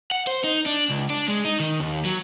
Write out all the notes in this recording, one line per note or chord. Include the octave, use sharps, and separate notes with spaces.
F#5
C5
D#4
D4
C#2
D4
G#3
D#4
D#3
D#2
F#3